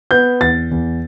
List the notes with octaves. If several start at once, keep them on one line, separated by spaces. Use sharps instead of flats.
B3 G6
E2 A6
E2